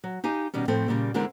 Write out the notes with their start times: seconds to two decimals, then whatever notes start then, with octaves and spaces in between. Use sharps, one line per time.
0.04 F#3
0.24 D#4 G4 F5 G#5
0.54 B2 D#3 G3 C#4
0.68 A2 F3 C4 A4 G5
0.88 A#2 C#3 G3 A#3
1.14 E2 D3 G#3 C4 E4 A#4